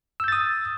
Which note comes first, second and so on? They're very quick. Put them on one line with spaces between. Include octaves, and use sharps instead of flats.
E6 G6 A6 D#6